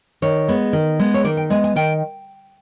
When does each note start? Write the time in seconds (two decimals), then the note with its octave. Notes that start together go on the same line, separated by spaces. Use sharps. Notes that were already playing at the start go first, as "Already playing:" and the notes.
0.22 D#3 C#5
0.48 G#3 B3
0.73 D#3
0.99 G#3 B3
1.14 C#5
1.25 D#3 D5
1.37 G5
1.50 G#3 B3 G#5
1.64 G#5
1.76 D#3 G5